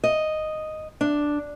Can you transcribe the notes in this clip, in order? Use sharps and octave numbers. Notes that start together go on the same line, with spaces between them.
D#5
D4